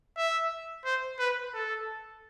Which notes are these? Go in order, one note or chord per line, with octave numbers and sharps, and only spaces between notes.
E5
C5
B4
A4